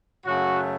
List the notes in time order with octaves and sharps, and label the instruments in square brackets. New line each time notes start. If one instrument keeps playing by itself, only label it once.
[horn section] F#2 C#3 F#3 A3 C#4 F#4